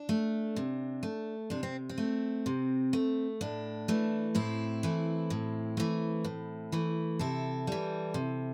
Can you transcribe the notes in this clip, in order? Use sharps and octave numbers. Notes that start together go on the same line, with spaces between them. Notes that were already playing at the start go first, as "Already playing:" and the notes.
Already playing: D4
A3
C3
A3
C3 D4
C4
C4
A3
C3
A3
A2 D4
E3 A3
A2 C4 E4
E3 A3
A2
E3 A3
A2
E3 A3
C3 E4 A4
E3 G3
C3